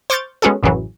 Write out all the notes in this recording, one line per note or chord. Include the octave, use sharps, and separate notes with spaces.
C5 C#6 D6 F6 G6 A6
G#3 B3 C#4 F#4 G#4 A4
A1 F#2 C#3 E3 F#3